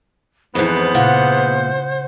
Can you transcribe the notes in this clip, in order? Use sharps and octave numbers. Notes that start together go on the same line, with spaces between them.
F2 G#2 E3 B3 C5
A#2 C#3 F#5